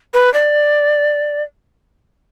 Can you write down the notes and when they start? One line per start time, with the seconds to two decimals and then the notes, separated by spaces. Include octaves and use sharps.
0.14 B4
0.34 D5